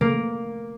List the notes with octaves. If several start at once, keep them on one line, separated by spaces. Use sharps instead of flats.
A#3